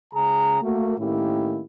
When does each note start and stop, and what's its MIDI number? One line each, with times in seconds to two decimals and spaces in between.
0.13 0.62 37
0.13 0.62 49
0.13 0.62 68
0.13 0.62 82
0.62 0.97 57
0.62 0.97 58
0.62 0.97 66
0.98 1.61 45
0.98 1.61 51
0.98 1.61 58
0.98 1.61 61
0.98 1.61 64
0.98 1.61 67